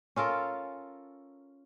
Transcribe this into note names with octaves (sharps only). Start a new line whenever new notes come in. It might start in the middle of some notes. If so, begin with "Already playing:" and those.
C#4 F4 A4 A#4